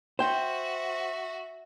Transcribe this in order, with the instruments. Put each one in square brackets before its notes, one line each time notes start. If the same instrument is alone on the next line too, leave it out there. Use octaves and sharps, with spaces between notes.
[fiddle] F#4 E5 [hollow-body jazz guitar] C5 G5